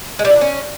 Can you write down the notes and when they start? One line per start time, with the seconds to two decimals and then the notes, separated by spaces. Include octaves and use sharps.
0.19 G#3
0.25 G3
0.30 E4
0.36 D4
0.41 C#4